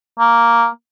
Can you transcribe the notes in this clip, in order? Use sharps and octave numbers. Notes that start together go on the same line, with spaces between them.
A#3